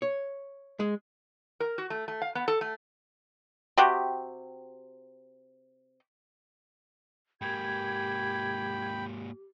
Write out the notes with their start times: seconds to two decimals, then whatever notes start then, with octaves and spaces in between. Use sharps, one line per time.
0.02 C#5
0.80 G#3
1.60 A#4
1.78 F#4
1.90 A3
2.08 A3
2.22 F5
2.35 B3
2.48 A4
2.61 A3
3.78 C3 F#4 G4
7.41 G#2 A#3 G4 G5 B5 G#6